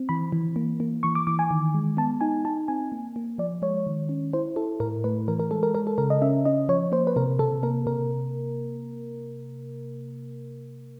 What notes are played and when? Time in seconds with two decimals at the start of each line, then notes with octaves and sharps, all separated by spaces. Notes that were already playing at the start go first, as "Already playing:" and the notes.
Already playing: C4
0.09 E3 B5
0.32 E3
0.56 A#3
0.80 A#3
1.03 E3 C#6
1.15 D6
1.27 E3 D6
1.39 G#5
1.51 D#3
1.74 G#3
1.97 B3 A5
2.21 D#4 G#5
2.45 D#4 A5
2.68 C4 G#5
2.92 A#3
3.16 A#3
3.38 F3 D5
3.62 G#3 C#5
3.87 D#3
4.09 C#4
4.33 E4 C5
4.56 E4 A4
4.80 A2 A#4
5.04 A3 B4
5.28 E3 A#4
5.40 A#4
5.51 G#3 A4
5.63 A#4
5.75 G#3 A#4
5.87 A4
5.98 C#3 A#4
6.10 D#5
6.22 C#4 E5
6.45 C#4 D#5
6.69 F3 C#5
6.92 A#3 C5
7.07 B4
7.16 C3 A#4
7.39 C3 A4
7.63 A#3 A#4
7.86 C3 A#4